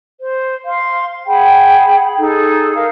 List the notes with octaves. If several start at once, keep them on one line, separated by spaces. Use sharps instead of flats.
C5
F5 C6
G#4 F#5 G5 B5
D#4 G#4 A4
A#4 F5